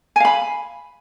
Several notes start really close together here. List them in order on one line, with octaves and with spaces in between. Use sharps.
G#5 F5 B5